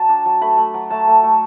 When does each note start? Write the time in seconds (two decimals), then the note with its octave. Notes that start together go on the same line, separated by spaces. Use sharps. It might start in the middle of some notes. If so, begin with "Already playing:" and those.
Already playing: F#3 A5
0.09 D4
0.26 F#3
0.41 A3 B5
0.57 A3
0.74 F#3
0.90 A3 A5
1.07 A3
1.23 A3